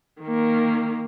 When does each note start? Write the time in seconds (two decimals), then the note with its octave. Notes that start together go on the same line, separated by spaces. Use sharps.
0.21 D#3 A#3